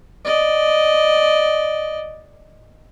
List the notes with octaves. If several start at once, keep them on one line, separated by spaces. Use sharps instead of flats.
D5 D#5